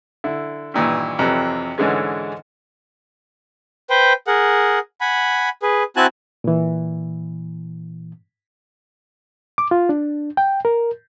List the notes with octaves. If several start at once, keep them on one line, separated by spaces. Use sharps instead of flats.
D3 E4
G2 A#2 D#3 E3
F2 C3 E3 F#3
G#2 D3 E3 G#3 C#4
B4 C5 G5
G#4 A#4 F#5
F#5 G#5 B5
G#4 B4
C4 E4 F#4 G#5 A5 F#6
A#2 E3
D6
F4
D4
G5
A#4